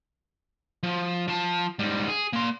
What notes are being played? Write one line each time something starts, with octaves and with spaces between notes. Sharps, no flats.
F3
F3 A5
G#2 G3
G#4
A#3 C6